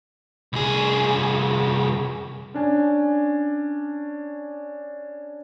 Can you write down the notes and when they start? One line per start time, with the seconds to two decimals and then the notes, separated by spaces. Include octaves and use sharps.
0.53 C2 G#4
2.54 C#4 D4 G#5